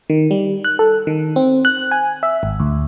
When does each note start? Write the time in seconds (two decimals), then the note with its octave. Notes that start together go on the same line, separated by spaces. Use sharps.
0.10 D#3
0.31 G3
0.65 F#6
0.79 A4
1.07 D#3
1.36 C4
1.65 F#6
1.91 G#5
2.23 E5
2.43 G#1
2.60 D2